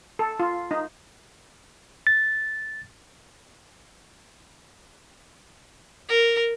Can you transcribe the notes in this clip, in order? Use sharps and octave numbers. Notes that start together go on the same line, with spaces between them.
A4
F4
D#4
A6
A#4